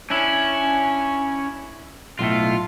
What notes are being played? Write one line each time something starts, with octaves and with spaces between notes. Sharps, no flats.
C#4 D4 E4
B1 A2 A3 F4